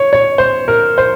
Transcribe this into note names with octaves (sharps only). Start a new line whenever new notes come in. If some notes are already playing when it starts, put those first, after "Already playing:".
Already playing: C#5
C#5
C5
A#4
C5